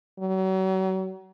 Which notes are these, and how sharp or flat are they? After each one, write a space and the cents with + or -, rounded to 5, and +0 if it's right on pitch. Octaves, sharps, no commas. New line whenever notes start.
F#3 +35